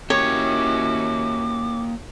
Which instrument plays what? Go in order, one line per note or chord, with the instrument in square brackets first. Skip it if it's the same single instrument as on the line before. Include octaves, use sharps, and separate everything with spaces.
[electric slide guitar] A#3 G4 [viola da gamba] C#4 E4 F#4 [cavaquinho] C#5 [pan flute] D6